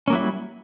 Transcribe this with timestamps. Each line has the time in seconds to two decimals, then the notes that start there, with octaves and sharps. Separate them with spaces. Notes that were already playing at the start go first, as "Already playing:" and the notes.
0.08 C#4
0.10 A#3
0.13 F#3
0.15 E4
0.18 G3